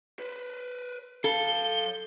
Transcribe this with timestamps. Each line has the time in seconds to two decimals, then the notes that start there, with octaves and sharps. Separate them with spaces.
0.19 B4 C5
1.24 F#3 A4 F5 G7